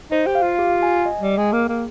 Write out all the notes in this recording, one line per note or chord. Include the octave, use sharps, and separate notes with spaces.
D#4 C5
G4
F5
F4
G4
G#5
D#5
G3
G5
G#3
A#3 G#4
A#3